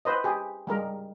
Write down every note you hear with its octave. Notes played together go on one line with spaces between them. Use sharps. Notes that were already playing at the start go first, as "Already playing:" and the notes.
B4 C5 D#5
G4 G#4
G3 G#3 A#4